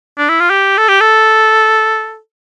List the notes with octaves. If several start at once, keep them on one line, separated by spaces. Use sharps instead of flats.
D4
E4
F4
G4
A4
G4
A4